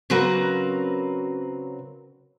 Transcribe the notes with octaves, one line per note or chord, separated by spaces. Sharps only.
C#3 F#3 C4 F#4 A#4 B4